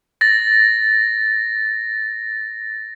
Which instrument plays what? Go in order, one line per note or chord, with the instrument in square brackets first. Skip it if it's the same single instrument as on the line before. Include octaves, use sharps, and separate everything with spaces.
[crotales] A6 A#6